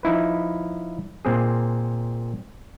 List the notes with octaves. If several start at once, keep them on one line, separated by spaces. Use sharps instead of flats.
F3 D#4 E4 B4
A#2 C4 G#4